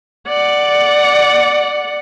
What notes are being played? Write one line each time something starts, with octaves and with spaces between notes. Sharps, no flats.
D5 F#5